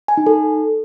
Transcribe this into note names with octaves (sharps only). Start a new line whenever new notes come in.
G#5
D#4
A4